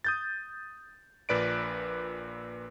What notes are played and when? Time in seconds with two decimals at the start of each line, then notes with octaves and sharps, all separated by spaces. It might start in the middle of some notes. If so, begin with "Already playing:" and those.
0.04 D#6 G6 A6
1.29 A#1 A#2 B4 D5 D7